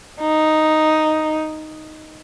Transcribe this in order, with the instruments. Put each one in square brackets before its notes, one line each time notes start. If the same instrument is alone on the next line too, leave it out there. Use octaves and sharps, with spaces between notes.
[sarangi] D#4